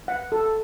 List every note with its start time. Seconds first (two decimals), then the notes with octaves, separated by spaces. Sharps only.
0.08 F#5
0.32 A4